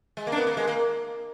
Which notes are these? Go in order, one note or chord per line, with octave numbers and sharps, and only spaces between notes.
G#3
A#3
D4
B3
A#3
G#3
A#3